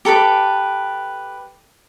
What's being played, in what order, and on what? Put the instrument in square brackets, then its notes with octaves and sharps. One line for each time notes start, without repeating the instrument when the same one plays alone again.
[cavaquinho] G4 A4 B4 D6